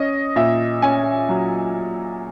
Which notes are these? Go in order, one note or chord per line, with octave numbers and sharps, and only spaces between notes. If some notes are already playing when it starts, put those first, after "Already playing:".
Already playing: C#4 D#5
A#2 E5
C#4 G#5
F#3